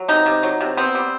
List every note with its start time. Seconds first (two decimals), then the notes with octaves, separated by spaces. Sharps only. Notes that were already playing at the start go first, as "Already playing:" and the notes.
Already playing: F#3
0.08 C3 D#4
0.26 C3
0.43 F#3
0.61 C3
0.77 B3 C4
0.95 G3